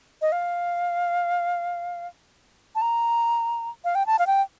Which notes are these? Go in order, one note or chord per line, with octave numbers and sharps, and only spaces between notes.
D#5
F5
A5
A#5
F5
G5
A5
F5
G5